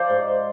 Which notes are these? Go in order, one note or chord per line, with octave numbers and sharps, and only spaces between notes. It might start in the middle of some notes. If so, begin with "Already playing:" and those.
Already playing: F3 C5 D5
G#2